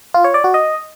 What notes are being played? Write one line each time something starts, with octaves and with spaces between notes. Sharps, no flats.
F4
C#5
D5
F#4
D#5